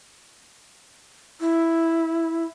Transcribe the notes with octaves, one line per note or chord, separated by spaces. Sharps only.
E4